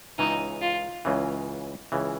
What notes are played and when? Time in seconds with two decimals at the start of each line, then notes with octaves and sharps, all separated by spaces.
0.18 C#2 C#3 E3 D#4
0.62 F4
1.05 C#2 C#3 E3
1.92 C#2 C#3 E3